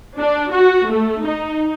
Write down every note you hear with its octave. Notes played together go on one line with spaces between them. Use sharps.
D4
F#4
A3
D#4